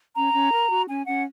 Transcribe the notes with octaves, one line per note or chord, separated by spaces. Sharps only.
C#4 A#5
C#4
A#4
F#4
C#4 G#5
C#4 F#5